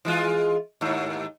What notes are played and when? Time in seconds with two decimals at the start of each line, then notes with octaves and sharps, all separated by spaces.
0.05 E3 G#3 F4
0.81 D#2 G#2